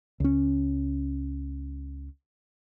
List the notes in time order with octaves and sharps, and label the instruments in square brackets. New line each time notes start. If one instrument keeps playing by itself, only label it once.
[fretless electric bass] C#2 C#4